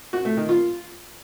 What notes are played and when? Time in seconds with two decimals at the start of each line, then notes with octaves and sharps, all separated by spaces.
0.13 F#4
0.25 A3
0.37 D#3
0.49 F4